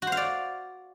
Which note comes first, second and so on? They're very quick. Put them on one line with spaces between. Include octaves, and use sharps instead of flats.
F#4 C5 F5 D5